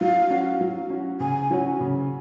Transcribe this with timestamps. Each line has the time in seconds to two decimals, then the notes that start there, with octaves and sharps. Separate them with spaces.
0.01 F#3 F5
0.30 C#4 F#4
0.61 F#3
0.90 C#4 F#4
1.20 C#3 G#5
1.50 F#3 C#4 F#4 C#5
1.81 C#3